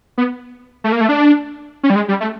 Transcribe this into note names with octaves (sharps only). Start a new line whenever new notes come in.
B3
A3
A#3
A3
D4
C#4
G3
G#3
G3
A3